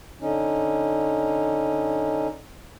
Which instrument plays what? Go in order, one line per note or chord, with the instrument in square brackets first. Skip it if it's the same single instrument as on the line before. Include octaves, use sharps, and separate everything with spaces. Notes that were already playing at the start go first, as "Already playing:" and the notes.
[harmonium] D3 C#4 D#4